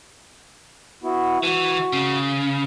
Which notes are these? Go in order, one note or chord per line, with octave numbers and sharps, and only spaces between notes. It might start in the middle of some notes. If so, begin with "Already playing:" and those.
B3 E4 F#4
E3 F#4
C#3